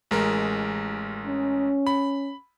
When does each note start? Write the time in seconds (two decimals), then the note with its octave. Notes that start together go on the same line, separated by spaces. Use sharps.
0.11 A1 G#3 A#4
1.27 C#4
1.87 B5